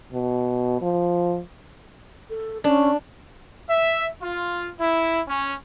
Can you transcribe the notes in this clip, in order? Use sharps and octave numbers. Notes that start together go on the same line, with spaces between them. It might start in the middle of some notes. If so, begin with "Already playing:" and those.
B2
F3
A4
C#4 D4
E5
F4
E4
C#4